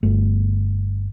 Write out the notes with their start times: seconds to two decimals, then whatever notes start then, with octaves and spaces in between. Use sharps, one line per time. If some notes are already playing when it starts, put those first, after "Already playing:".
0.03 G1 A3